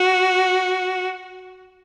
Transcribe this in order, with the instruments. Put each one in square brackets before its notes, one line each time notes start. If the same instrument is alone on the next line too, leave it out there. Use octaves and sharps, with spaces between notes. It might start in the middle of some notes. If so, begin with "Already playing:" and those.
Already playing: [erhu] F#4